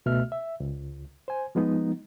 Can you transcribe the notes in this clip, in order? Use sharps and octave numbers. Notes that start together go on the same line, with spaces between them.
C#2 B2 A3 E5 F6
E5
C#2
C5 G#5
F3 G#3 B3 D#4